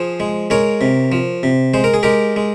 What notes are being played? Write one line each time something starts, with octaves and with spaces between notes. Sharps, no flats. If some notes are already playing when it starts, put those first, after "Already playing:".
Already playing: F3 G#4 C5
G#3
G#3 A#4 C#5
C3
F3
C3
G#3 C5
A#4
G#4
G#3 G4 A#4
G#3